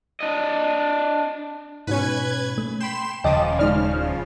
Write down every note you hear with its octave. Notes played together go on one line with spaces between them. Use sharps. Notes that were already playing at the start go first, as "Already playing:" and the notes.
D4 D#5
G#2 B2 C#4 B4 G#6
A3
G5 B5 C6 E7
D#1 C#3 F3 D#5 G5 A5 D6 D#6
G#3 D#4 D5 F6